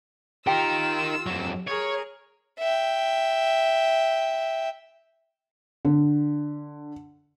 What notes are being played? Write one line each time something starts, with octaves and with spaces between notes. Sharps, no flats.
D#4 F4 G4 A#4 E6
F2 F#3
G#4 A#4 C#5
E5 G5
D3